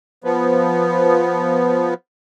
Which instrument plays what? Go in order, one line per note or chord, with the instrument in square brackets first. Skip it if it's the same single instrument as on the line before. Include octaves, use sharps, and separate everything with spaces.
[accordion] F3 B3